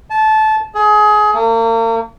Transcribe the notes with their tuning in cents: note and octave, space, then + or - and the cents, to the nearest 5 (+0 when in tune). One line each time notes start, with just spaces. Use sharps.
A5 -20
G#4 +25
A#3 -40